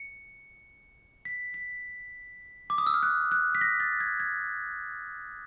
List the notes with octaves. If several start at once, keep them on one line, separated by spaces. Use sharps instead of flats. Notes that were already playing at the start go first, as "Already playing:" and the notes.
Already playing: C#7
B6
B6
D6
D#6
E6
F6
F#6
F#6
B6
A#6
A6
G#6
G#6